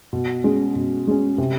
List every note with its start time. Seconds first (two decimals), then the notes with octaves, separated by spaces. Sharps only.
0.13 B2
0.44 G#3 C#4
0.75 B2
1.07 G#3 C#4
1.38 C3